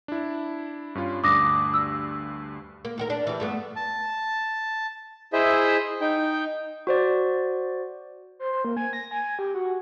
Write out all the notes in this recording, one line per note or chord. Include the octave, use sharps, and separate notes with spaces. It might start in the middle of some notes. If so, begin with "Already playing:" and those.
D4 E4
G2 C#4 F4
D2 G2 D4 D6 D#6 A#6
E6
A#3
D#2 F#4 A#4
D4
E3 G3
G2 A3 B3
A5
E4 G#4 C5 D#5 E5
D#4 G5
F#4 C5 D5
C5
C5
A#3
G#5
A#6
G#5
G4
F#4